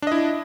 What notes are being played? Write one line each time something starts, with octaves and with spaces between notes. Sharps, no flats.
D4 E4 D#5